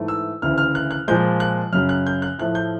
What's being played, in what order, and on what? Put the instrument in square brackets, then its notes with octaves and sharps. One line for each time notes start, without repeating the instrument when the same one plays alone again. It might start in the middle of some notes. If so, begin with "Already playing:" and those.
Already playing: [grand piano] G#2 E3 A3
E6
D2 C#3 E3 F6
F6
F#6
F#6
A#2 F3 G#3 G6
F#6
F#2 C#3 F#3 F6
F#6
G6
F#6
A2 F3 A3 F#6
G6